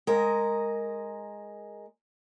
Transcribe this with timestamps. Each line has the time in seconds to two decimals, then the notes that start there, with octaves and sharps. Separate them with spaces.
0.07 G#3 A#4